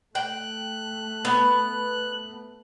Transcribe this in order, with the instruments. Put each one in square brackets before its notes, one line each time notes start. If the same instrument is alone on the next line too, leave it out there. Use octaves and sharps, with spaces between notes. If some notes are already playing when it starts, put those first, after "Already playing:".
[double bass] A3 [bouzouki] G5 [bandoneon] F#6
[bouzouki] B3